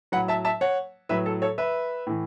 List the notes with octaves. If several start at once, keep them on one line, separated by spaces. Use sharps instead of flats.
A2 F#3 F#5 B5
E5 A5
E5 A5
C#5 F#5
A2 F#3 B4 E5
A4
A4 C#5
B4 E5
A2 E3